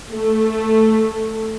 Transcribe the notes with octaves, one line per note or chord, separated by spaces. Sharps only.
A3